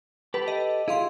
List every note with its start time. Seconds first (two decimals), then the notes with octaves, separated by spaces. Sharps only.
0.34 G4 A4 B4 B5
0.48 D#5
0.88 E4 F4 G#4 F5 C6